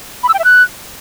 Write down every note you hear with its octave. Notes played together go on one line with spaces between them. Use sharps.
B5
E6
G5
E5
F#6